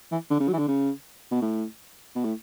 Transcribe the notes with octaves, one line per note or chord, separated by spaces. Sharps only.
E3
D3
C#3
F#3
E3
D3
C#3
B2
A2
B2
A2